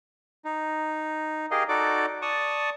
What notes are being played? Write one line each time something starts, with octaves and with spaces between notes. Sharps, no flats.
D#4
G4 G#4 A#4 D#5 F5
D#4 F#4 A4 D5 D6
D5 A5 C#6 D#6